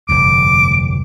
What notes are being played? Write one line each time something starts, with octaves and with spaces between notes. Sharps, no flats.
F1 D2 G2 D6